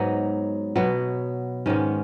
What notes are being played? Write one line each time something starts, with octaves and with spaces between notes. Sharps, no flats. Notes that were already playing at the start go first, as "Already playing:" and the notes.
Already playing: G#2 F#3 B3 D#4
B2 F#3 B3
G#2 D#3 G#3 B3 C#4